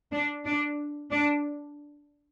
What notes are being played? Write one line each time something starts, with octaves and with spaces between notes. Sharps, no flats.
D4
D4
D4